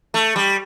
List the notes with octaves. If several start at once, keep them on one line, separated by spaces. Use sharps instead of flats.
A3
G3